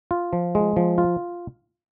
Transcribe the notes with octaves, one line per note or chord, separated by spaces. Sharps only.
F4
F3
G#3
F3
F4